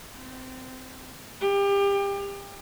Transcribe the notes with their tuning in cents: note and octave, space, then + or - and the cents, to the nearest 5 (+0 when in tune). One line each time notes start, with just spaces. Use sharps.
C4 -20
G4 +30